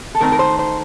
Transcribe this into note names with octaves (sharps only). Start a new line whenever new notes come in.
A4
D#3 A3 C4 D#4 A#4
A#4
C5
C5